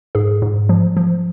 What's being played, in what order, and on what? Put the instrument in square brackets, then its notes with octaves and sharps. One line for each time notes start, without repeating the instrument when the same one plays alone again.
[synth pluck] G#2 G#4
G#2
F3
F3